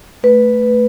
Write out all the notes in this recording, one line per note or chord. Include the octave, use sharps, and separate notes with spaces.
A3 B4